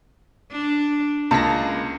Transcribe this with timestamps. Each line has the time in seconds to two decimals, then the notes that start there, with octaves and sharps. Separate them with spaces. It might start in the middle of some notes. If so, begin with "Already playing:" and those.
0.51 D4
1.31 C#2 A#3 A5 A#6